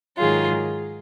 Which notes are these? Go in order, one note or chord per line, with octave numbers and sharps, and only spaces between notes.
G#2 D#3 F#3 F4 G#4